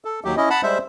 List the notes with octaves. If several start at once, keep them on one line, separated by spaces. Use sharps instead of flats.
A4
D#2 F#3 G4
C#4 E4 D#5
F#5 A5 B5
G3 G#3 C5 E5